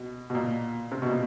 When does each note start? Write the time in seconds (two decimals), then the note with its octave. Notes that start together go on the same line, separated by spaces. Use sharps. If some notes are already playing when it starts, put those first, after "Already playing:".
Already playing: B2
0.30 B2
0.35 A#2
0.91 C3
1.02 B2
1.10 A#2